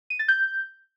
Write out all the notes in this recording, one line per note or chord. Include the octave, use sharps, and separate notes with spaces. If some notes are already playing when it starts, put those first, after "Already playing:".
D#7
A6
G6